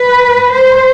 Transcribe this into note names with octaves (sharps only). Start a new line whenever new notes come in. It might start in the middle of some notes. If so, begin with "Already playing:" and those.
Already playing: B4
C5